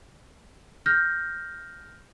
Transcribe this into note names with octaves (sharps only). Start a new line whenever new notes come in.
F6 G6 A#6